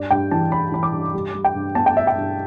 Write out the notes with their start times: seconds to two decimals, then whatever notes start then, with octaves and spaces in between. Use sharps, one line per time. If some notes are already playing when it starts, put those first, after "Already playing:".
Already playing: G2 D5
0.11 G2 G5
0.31 E3 A5
0.52 G2 B5
0.72 E3 B5
0.83 D6
0.93 G2
1.14 G3
1.34 G3
1.45 G5
1.55 G2
1.75 B3 A5
1.86 G5
1.96 D4 E5
2.07 G5
2.16 G2